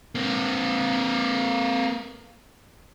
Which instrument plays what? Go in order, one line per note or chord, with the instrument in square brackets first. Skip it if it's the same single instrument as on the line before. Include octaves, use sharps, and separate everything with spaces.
[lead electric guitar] A#3 C4